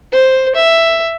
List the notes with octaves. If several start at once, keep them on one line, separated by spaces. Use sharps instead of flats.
C5
E5